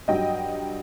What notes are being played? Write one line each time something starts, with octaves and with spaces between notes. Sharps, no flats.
G2 F#3 D#5 G5